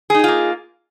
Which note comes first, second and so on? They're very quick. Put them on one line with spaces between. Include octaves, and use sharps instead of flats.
G#4 D#4 G4 F4 A#3